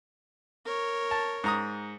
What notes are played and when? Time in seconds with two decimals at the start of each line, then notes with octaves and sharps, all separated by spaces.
0.66 A#4 C#5
1.11 A5
1.44 G#2 A#5 D#6